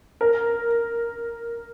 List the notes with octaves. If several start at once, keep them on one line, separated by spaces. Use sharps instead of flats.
A#4